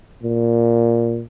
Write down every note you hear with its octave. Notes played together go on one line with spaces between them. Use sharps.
A#2